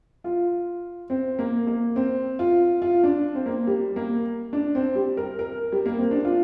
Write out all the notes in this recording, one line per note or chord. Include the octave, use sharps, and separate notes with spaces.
F4
C4
A#3
A#3
C4
F4
F4
D4
C4
A#3
G3
A#3
D4
C4
G3
A#4
A#4
G3
A#3
C4
D4
F4